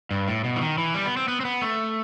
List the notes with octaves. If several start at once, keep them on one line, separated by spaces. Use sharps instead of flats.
G2
A2
B2
E3
D#3
E3
G3
B3
C4
B3
C4
B3
A3